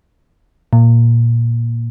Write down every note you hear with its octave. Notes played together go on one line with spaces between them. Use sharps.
A#2